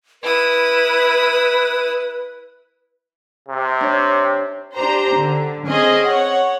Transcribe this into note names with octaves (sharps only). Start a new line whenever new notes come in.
E4 B4 D#6
C3
D4 C#5
D4 G4 C5 A#5
D3
C4 C#4 G#4 C5 D#5 G#5
C#5 F#5